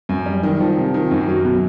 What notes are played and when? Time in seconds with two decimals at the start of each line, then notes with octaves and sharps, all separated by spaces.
0.09 F#2
0.26 G3
0.43 D#3
0.60 F3
0.77 C3
0.94 D#3
1.11 F#2
1.28 F#3
1.45 B2